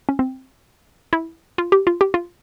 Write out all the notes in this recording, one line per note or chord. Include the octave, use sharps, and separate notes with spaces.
C#4
C4
E4
F4
G4
F4
G4
F4